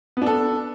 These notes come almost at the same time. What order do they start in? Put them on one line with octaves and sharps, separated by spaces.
B3 D4 A4